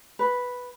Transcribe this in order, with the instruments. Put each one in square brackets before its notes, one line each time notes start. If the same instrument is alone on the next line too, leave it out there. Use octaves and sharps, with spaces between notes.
[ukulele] B4